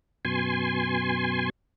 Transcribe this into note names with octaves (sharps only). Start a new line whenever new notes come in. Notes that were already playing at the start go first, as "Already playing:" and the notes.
F#2 B2 G#5 C6